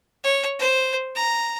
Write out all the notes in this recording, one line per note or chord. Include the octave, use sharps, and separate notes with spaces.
C#5
C5
A#5